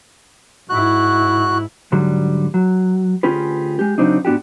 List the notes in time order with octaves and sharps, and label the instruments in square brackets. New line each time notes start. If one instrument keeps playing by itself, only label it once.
[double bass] G#2 E4 [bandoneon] F#4 F#6
[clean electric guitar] G#2 D3 F#3 G3
F#3
D2 C#4 F4 G4 G#4 B4
G#3 G4
C#3 F#3 C4 D4 D#4
G#2 B3 D4 F#4 G4